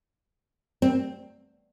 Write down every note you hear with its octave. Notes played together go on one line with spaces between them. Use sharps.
C4